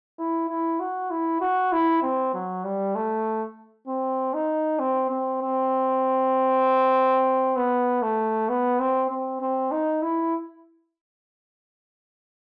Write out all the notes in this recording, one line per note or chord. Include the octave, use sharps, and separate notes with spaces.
E4
E4
F#4
E4
F#4
E4
C4
F#3
G3
A3
C4
D#4
C4
C4
C4
B3
A3
B3
C4
C4
C4
D#4
E4